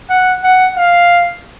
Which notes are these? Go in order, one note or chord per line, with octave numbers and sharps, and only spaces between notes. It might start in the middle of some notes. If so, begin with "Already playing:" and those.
F#5
F#5
F5